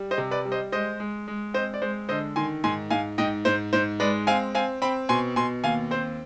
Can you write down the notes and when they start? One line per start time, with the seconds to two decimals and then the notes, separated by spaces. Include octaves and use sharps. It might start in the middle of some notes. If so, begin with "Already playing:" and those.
Already playing: G3
0.11 C5 D#5
0.18 C3
0.31 B4 D5
0.45 G3
0.52 C5 D#5
0.72 G#3 C5 D#5
1.00 G#3
1.28 G#3
1.54 C4 C5 D#5
1.74 D5
1.81 G#3 C5
2.09 D3 C5 D#5
2.36 D#3 G#5 C6
2.64 G#2 G#5 C6
2.90 G#2 F5 G#5
3.18 G#2 D#5 G5
3.45 G#2 C5
3.73 G#2 C5
4.00 G#3 B4 D5
4.27 C4 F5 G#5
4.55 C4 F5 G#5
4.82 C4 G5 B5
5.09 B2 G#5 C6
5.36 B2 G#5 C6
5.64 D#2 F5 G#5
5.91 C4 C5